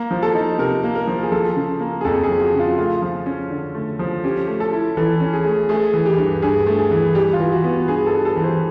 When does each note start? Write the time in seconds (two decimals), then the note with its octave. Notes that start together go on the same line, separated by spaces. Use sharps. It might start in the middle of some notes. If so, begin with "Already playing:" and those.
Already playing: A#3
0.11 F3
0.22 A4
0.35 D#4
0.59 C3 A#4
0.83 A#3
0.95 A#4
1.07 F3
1.23 G#4
1.32 F3 A4
1.56 C#3
1.80 A#3
2.01 G#4
2.05 F2 A4
2.23 G#4
2.29 F3
2.41 F#4
2.54 C#3
2.60 F4
2.78 A3 F4
3.02 F3
3.26 C#4
3.50 D3
3.75 A3
3.99 F3
4.24 C#4 G4
4.47 A3
4.60 A4
4.73 E4
4.97 E3 A4
5.20 C#4
5.33 G#4
5.45 A3
5.69 A3 G#4
5.94 E3
6.06 G4
6.18 G2
6.42 G2 G#4
6.67 A3
6.79 G#4
6.91 E3
7.15 G3 G4
7.33 F4
7.40 E3
7.52 F#4
7.64 B3
7.88 G2 G#4
8.06 A4
8.13 G3
8.25 A4
8.36 E3
8.44 C5